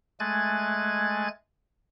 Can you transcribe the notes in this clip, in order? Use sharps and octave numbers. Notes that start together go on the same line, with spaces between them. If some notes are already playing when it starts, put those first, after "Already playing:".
G#3 A3 G#5 F#6 G#6 A6